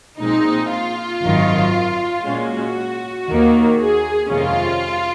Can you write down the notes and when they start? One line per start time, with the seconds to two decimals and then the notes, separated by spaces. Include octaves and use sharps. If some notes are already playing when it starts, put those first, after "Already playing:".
0.20 A#1 A#2 G#3 C4 D#4
0.72 F4
1.23 G#1 F#2 D#3
2.25 A#2 G#3 C#4 F#4
3.28 D#2 D#3 A#3
3.80 G#4
4.30 F2 C3 D#3 G#3 C#4 F4